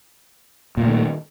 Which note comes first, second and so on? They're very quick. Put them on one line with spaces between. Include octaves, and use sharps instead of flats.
A#2 A3 D#3